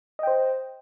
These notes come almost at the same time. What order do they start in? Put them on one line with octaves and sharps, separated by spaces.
D#5 G5 C5